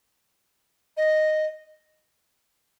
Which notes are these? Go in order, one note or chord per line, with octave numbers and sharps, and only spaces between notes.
D#5